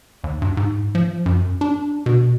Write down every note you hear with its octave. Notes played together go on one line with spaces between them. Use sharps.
D#2
G2
G#2
F3
F#2
D4
B2